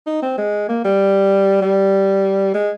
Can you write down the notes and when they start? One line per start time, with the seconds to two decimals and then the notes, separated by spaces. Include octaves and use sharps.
0.07 D#4
0.23 C4
0.38 G#3
0.69 A#3
0.84 G3
1.62 G3
2.54 G#3